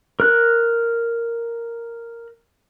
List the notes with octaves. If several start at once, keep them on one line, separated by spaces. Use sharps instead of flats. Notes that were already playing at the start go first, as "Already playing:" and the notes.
A#4 F#6